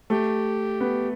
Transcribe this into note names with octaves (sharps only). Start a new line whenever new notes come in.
A3 G4
B3